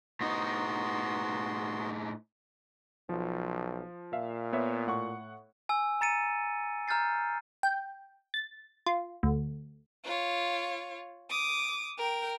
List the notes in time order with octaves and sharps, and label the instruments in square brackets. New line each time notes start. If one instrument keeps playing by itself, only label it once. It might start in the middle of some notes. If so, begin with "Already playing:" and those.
[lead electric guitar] A2 D#4 [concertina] B3 F#4 C6
[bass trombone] B1 [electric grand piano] F3
[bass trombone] A#2 [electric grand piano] E5 F5
[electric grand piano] B3 C#5 E5
A2 F#5 C#6
[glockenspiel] G#5 E6
A#5 A6 C#7 D#7
A#5 F6 G6 A6 C7
[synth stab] G5
A6
F4
D2
[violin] F4 C#5
D6 D#6
A#4 G5